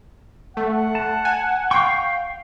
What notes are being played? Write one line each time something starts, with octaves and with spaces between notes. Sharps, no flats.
A3 F#5
A5
G#5
F5 G5 C#6